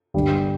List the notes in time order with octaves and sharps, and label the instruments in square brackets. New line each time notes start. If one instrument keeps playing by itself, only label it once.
[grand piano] G1 G2 G3